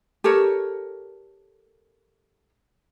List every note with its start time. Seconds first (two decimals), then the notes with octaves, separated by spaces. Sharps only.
0.24 G4 A4 A#4 C#5